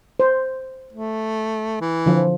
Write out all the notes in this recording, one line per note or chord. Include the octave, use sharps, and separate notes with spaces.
C5
A3
E3
D3 F3